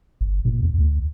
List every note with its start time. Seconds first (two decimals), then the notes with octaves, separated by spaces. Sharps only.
0.21 G1
0.45 A#2
0.63 E2
0.79 D2